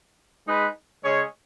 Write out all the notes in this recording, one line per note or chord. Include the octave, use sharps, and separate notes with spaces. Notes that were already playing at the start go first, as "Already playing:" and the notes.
G#3 D#4 G#4 B4
C#3 G#3 C#4 G#4 C#5